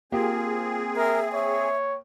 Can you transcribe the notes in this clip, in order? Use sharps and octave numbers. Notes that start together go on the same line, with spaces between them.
A#3 C4 F4 G4 G#4
A#4 E5
C#5 E5